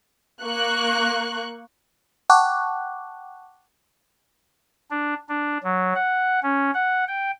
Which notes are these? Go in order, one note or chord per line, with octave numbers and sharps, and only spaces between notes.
A#3 C#6 F#6
F#5 G5 A5 C#6 D6 F#6
D4
D4
F#3
F#5
C#4
F#5
G5